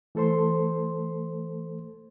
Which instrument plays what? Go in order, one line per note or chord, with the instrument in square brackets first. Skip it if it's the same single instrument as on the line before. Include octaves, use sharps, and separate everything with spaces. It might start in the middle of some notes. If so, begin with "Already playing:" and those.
[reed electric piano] E3 A3 A4 C5 C6